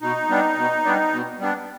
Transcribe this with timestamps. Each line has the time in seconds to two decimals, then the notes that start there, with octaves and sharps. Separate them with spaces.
0.02 B2 D#4
0.30 G3 B3 D4
0.57 B2
0.84 G3 B3 D4
1.12 B2
1.39 G3 B3 D4